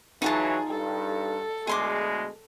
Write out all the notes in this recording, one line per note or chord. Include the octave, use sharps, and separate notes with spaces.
E3 F#3 D#4 F4 G#4 A5
G2 A4
D2 B2 G#3 G#4 C6 D6